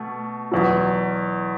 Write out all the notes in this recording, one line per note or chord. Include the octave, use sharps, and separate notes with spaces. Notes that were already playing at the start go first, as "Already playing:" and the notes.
Already playing: B2 A3
E2 B2 F#3